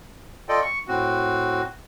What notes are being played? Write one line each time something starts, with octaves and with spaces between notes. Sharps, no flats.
F4 A4 D5 D#5 G5
C#6
A2 C4 F#4